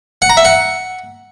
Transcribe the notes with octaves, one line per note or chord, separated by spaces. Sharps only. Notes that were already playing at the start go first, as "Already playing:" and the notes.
F#5
A#5
E5
F#5